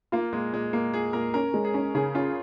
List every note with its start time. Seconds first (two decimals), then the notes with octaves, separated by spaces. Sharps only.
0.12 A#3 F4
0.33 A#2 G#3
0.53 A#2 G#3
0.73 A#2 A#3
0.93 A#2 G#4
1.13 A#2 A#4
1.34 C#4 A#4
1.54 G#3
1.65 G#4
1.74 C#4
1.95 C#3 G#4
2.14 C#4 F4